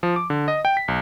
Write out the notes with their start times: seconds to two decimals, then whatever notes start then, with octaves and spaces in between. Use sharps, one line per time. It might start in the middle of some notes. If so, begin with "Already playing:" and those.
0.03 F3
0.16 D6
0.30 D3
0.48 D#5
0.65 G5
0.77 B6
0.88 B1